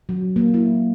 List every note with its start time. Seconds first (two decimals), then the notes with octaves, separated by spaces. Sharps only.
0.09 F#3
0.36 A#3
0.54 E4